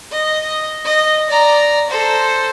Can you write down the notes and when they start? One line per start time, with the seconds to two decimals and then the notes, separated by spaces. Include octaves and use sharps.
0.11 D#5
0.85 D#5
1.29 D5 A#5
1.89 A4 C5